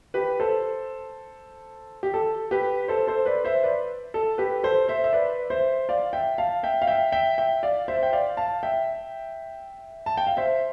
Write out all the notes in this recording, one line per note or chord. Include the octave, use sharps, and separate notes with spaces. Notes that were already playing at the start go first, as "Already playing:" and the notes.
G4 B4
A4 C5
G4
A4
G4 B4
A4 C5
A4 C5
B4 D5
C5 E5
B4 D5
A4
G4 B4
A4 C5
C5 E5
E5
B4 D5
C5 E5
D5 F5
E5 G5
F5 A5
E5 G5
F5
E5 G5
E5 G5
E5 G5
D5 F5
C5 E5
G5
D5 F5
F5 A5
E5 G5
A5
G5
F5
C5 E5